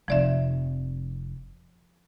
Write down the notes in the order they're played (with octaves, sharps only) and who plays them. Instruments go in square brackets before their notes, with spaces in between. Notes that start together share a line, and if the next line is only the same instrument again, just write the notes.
[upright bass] F1 C4 [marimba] F3 D5 E5